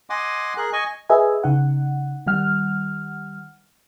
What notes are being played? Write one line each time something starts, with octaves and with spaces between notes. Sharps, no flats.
D#5 F#5 G#5 C6 D6
G#4 A#4 F#6
D#5 G#5 C#6
G#4 B4 D#5 E5 G#5
C#3 D#4 F#5
D#3 G3 F#5 F6